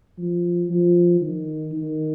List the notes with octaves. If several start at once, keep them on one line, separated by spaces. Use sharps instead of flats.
F3
F3
D#3
D#3